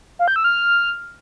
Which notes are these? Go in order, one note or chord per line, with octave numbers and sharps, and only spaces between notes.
F5
G6
E6
F6